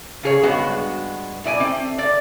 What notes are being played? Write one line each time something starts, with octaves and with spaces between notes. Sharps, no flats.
C#3 G#4 C#5
G2 G#3 B3 F#4
B2 E4 D5 G#5
A3 C4
D5